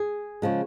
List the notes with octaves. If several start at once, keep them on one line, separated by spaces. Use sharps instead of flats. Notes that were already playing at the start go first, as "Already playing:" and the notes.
Already playing: G#4
C#3 F3 G#3